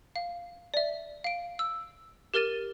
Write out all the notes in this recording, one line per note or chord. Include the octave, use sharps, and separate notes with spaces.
F5
D5 E5
F5 D7
E6
G4 A#4 F6 A6 D#7